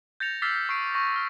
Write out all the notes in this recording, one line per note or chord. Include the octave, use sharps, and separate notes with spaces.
G6 A6 A#6 C#7 F7
D6 E6 F6 A6 B6 C7
F6
C#6 F6 C7 D7
C#6 A#6
F6